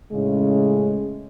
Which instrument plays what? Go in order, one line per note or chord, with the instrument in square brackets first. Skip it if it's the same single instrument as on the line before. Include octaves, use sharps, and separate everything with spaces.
[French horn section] A2 C#3 G#3 C#4